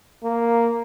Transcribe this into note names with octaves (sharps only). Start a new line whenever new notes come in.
A#3